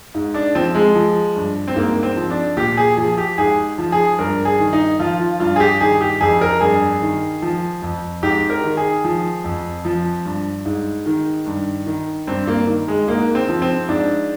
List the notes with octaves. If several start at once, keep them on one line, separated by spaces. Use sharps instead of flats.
G#2
D4
F3 C4
G#3
F3
G2
C4
G#2 A#3
C4
F3
D4
A#2 G4
G#4
F3 G#4
G4
G#2 G#4
F3
G#4
G2 A#4
G#4
D#3
D#4
F3 F4
F4
G2 F4
G#4
G4
D#3 G#4
G4
F2 G#4
A#4
G2 G#4
D#3
F3
F2
G#2 G4
A#4
D#3
G#4
F3
F2
F3
G2
G#2
D#3
G2
D#3
G2 C4
A#3
D#3
G#3
G#2 A#3
C4
F3
C4
G#2 D4